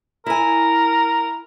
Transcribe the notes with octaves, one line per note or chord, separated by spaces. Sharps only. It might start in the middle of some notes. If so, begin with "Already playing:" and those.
E4 A#4 G#5